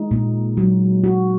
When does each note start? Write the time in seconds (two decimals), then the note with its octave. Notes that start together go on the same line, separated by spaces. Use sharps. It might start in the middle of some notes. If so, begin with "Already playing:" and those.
Already playing: G#3 D#4
0.11 A#2
0.57 F#3
1.04 F#4